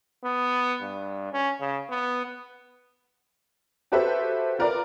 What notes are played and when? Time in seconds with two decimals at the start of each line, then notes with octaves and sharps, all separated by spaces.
0.25 B3
0.82 G2
1.32 C#4
1.61 C#3
1.90 B3
3.92 F#4 G4 A4 B4 C5 E5
4.59 F4 A#4 B4 D5